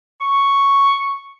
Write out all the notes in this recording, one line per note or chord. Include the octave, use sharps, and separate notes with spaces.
C#6